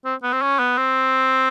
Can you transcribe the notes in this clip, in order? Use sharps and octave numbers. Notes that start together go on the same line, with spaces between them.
C4
B3
C4
C#4
B3
C4